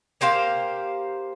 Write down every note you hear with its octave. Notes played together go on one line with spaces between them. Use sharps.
A#3 G4 C5 F5